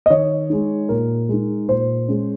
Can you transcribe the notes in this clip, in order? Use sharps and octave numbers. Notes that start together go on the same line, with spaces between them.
D#5
D#3 C#5
G#3 D#4
A#2 A#4
G#3 D#4
A#2 C5
G#3 C#4